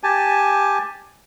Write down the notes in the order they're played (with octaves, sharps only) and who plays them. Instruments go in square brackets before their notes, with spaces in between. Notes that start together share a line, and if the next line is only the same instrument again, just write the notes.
[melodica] G4 G#5 A5